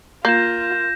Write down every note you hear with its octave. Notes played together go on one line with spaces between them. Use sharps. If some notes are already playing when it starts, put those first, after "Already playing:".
A#3 F4 G6 A#6 E7